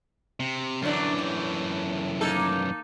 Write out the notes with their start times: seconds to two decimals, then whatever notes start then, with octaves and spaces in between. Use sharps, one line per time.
0.40 C3
0.82 F#2 D3 E3 F#3 D4
1.18 A2
2.21 A#3 D#4 A4